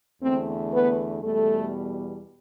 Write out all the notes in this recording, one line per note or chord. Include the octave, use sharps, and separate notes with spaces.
E2 D3 A3 C4
B3 B4
E2 B2 G3 A3 A4